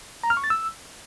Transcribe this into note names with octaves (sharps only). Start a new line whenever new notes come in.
A#5
F6
C#6
A6
E6